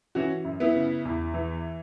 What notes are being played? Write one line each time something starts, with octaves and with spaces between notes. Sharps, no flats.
E3 C#4 F#4
F#2
B3 E4
C#3
E2
E3